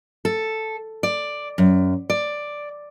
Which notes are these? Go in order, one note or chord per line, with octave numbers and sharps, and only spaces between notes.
A4
D5
F#2
D5